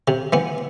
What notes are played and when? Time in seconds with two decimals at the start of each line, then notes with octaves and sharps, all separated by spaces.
0.08 C3
0.33 E3 B3